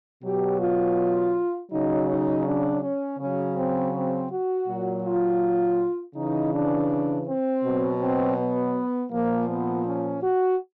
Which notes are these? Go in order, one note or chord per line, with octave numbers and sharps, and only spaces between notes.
B2 F#3 G4
F4
C#3 F#3 D#4
D#4
D4
C#4
C#3 F#3 C#4
C4
C4
F#4
A#2 F#3
F4
C#3 E3 D#4
D4
C4
B2 F#3
C4
B3
A#2 F3 A#3
B3
C#4
F#4